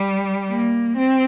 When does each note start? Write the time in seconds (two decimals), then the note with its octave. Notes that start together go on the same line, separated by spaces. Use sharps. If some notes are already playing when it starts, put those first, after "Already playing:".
Already playing: G3
0.49 A#3
0.97 C4